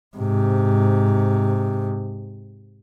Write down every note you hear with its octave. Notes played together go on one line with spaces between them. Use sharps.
G#2 C3